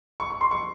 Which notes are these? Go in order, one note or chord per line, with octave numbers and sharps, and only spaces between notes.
C#6
C#6
C6
C#6